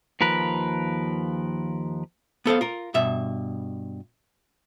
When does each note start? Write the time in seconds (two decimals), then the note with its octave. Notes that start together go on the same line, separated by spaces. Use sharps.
0.21 D#2 F3 A#4 B4
2.46 B3 A4 C5 F5
2.61 F4 A#4
2.94 G2 B2 E5